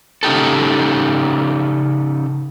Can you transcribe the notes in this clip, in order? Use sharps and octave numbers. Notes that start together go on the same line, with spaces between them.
C#3 D#4 G4 A4